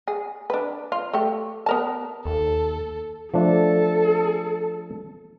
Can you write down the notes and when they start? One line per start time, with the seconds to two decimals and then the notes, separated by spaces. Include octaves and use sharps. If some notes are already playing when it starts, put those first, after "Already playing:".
0.08 G#4
0.50 D4 B4
0.92 F4
1.13 A3 G4
1.66 B3 A#4 A5
2.25 D#2 A4
3.34 F3 A3 D4 A4